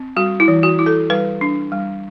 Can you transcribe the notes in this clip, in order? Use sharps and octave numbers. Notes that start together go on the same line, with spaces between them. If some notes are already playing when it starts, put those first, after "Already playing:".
Already playing: C4
G3 F#4
E4
E3
F#4
E4
A4
G3 B4
D4
G3